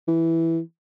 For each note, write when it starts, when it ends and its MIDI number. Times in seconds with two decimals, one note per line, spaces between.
0.08 0.60 52